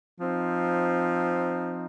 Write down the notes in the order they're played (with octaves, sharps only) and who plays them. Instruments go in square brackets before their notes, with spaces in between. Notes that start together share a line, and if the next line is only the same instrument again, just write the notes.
[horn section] F3 C4 D#4